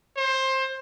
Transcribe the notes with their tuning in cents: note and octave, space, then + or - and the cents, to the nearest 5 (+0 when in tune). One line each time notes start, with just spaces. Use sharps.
C5 +20